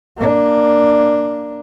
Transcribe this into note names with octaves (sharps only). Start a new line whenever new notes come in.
A#3 D4